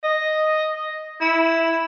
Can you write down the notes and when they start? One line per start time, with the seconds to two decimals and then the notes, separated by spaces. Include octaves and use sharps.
0.04 D#5
1.21 E4